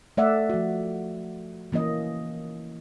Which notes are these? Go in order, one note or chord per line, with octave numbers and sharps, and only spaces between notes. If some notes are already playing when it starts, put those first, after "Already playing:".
A3 D5 E5 F#5
F3 F#4
E3 A#3 C#4 D#5